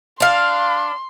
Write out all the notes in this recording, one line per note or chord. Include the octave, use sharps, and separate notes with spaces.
D4 F5 C6